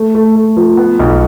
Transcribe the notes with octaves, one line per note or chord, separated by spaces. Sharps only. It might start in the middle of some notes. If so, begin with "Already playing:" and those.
Already playing: A3
A3
A3
F3
B3
B1